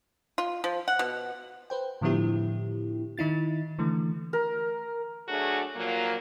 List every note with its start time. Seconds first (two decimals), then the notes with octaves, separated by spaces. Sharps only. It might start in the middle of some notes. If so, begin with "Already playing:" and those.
0.38 F4
0.64 F3
0.88 F#5
0.99 B2
1.70 B4 C5 G5
2.01 A2 D3 F3 B3 E4 G4
3.18 D#3 D#4 E4 A6
3.79 D3 E3 A3
4.33 A#4
5.29 F#3 A3 D4 F#4 G#4
5.76 A#2 F3 F#3 A#3